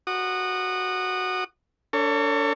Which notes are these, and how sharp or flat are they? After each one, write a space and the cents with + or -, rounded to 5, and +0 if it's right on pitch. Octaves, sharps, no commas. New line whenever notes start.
F#4 +0 D#6 -30
D4 -25 A4 +40 C#5 +0